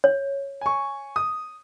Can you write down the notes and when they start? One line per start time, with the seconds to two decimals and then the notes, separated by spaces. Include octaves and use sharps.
0.04 C#5
0.61 G#5 C#6
1.16 D#6